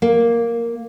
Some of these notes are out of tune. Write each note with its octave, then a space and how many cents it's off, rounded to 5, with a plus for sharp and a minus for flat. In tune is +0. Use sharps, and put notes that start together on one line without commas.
A#3 +0